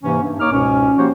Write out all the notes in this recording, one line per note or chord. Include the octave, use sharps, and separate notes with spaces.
G#2 C3 E3 A#3 C#4
G2
F#2 A#3 D#4 C#5 D6 F6
C#2 G#2 B2 C#4
F3 A#3 F#4 G4 C5 C#5